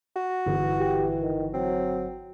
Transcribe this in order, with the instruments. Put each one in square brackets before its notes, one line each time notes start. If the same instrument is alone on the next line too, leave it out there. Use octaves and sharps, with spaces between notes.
[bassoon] F#4
[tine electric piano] G1 [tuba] E3
[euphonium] G4
D#3
[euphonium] F#3 [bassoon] C4